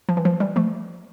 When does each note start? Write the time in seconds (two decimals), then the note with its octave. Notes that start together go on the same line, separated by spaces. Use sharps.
0.09 F3
0.17 E3
0.25 F3
0.40 E3 G3
0.56 F3 A3